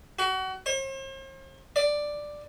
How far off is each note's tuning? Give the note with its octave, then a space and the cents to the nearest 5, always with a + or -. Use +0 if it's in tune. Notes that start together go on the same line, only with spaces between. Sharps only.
F#4 +30
C5 +45
D5 +5